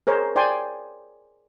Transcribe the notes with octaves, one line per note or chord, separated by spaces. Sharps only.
G#4 A#4 C5 C#5
C5 D5 G5 G#5 C6